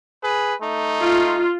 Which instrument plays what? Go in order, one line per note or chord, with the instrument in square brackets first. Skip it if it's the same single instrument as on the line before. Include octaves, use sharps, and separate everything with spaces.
[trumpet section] G#4 B4
A3 D#4
[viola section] F4